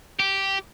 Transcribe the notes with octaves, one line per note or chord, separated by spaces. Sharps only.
G4